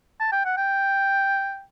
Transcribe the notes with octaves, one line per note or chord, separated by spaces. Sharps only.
A5
G5
F#5
G5